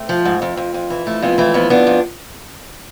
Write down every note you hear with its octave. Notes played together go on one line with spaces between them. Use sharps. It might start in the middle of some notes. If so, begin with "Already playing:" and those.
Already playing: A3 C4
F3
G#2
F2
F2
F2
E3
F2 A3
F2 G#3 B3
E3 A3 C4
F2 G#3 B3
F2 B3 D4
F2